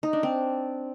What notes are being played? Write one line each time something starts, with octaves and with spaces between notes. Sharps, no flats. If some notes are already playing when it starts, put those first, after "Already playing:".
D#4
D4
C4